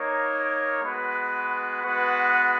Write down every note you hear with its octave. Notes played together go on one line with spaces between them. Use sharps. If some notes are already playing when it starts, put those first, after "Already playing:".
Already playing: A#3 D#4 A#4 C#5
G#3 B3 F#4 B4
G#3 B3 F#4 B4 F#5